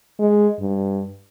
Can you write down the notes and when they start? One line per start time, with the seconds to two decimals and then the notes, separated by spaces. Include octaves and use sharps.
0.19 G#3
0.60 G2